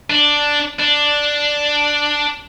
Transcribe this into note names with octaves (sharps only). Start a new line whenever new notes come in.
D4
D4